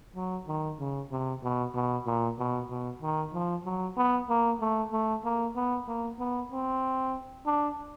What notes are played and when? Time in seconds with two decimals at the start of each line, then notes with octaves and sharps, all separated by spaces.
0.16 F#3
0.48 D#3
0.80 C#3
1.11 C3
1.43 B2
1.75 B2
2.07 A#2
2.39 B2
2.70 B2
3.02 D#3
3.34 F3
3.65 F#3
3.97 B3
4.29 A#3
4.61 A3
4.92 A3
5.24 A#3
5.56 B3
5.88 A#3
6.19 B3
6.52 C4
7.46 D4